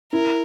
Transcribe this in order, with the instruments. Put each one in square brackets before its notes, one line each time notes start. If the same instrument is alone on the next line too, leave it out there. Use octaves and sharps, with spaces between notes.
[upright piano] E4 [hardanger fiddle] A#4